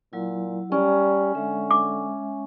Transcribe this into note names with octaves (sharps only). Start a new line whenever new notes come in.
A#2 F#3 E4
G3 C#4 D5 A#5
D3 G#3 E5
D6